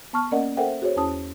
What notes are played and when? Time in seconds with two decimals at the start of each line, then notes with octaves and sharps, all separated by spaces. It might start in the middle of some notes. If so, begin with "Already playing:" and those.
0.13 B3 A5 C#6 F6
0.32 A#3 C#4 A#4 D5 D#5 F#5
0.57 A4 A#4 C5 E5 F#5 G5
0.82 F#4 G#4 C5 C#5
0.96 E2 C#4 E4 A5 D#6